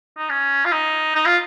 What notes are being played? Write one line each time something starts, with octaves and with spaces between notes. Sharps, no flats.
D#4
C#4
F4
D#4
D#4
F4